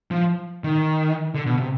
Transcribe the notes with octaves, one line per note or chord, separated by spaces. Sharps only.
F3
D#3
D3
B2
C3